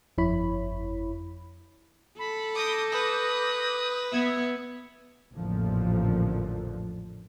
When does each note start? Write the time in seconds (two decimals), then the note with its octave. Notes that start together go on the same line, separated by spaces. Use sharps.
0.18 G1 F2 E4 C#5 B5
2.19 A4 B5
2.55 D6 D#6 G6 A#6
2.92 B4 D#6
4.12 B3 E5 G#6
5.35 A1 F2 A#2 D3 F3